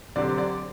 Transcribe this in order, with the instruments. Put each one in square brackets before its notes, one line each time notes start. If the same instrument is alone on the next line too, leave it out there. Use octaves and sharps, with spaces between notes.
[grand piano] D3 F#3 C4 G4 [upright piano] D5
[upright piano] D5